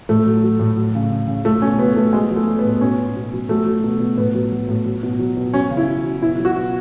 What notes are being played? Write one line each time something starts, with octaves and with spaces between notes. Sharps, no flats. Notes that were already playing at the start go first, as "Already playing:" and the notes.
A2 A3
F#3
F#3
A2
F#3
C#3
C#3
C#3
F#3 A3
B2 C#4
F#3 B3
B2 A3
F#3 G#3
F#3
A3
F#3
B3
A2
B2 C#4
B2
B2
F#3
F#3 A3
F#3
B2
B2
A2 B3
F#3
F#3
A2
F#3
B2
F#3
B2
F#3 C#4
C#3
E4
F#3
F#3
B2 E4
F#3
F#4
B2